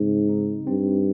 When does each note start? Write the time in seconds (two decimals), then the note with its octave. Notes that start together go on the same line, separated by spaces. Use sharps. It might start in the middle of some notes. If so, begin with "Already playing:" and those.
Already playing: G#2 C#3 C4
0.29 D#4
0.66 G2 C4